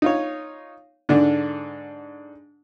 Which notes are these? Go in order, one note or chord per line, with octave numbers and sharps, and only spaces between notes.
D#4 F4 C#5
G#2 D3 D4